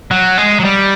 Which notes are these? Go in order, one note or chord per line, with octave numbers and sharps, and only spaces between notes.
F#3
G#3
F#3
G3